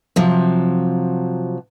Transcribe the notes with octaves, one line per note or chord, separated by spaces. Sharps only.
C3 F3 F#3